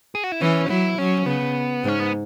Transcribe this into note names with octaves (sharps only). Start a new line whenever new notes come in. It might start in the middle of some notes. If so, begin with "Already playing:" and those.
G#4
F#4
E4
E3 C#4
F#3 E4
F#3 C#4
C#3 B3
G#2 C#4
B3